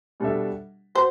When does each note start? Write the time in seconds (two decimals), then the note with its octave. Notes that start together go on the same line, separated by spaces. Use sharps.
0.20 B2 G3 D4 A4 E5
0.95 F#4 C5